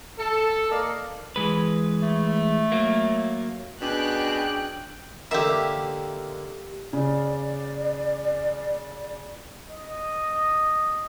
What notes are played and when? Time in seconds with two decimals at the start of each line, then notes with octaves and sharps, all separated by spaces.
0.18 A4
0.70 A#3 D5 D#5 F5
1.36 E3 G#3 B4
2.02 A3
2.72 F#3 A#3
3.81 B2 C#4 D4 G#4 G5 F#6
5.31 D3 D#3 A#3 G4 E5
6.93 C#3 D5
9.69 D#5